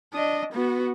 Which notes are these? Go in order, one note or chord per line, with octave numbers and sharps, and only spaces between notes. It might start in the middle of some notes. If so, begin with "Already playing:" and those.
D4 D#5
B3 F#4